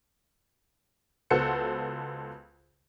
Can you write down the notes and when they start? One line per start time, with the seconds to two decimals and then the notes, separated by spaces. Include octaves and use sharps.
1.30 C#2 B3 F#4 A4 C5 C#7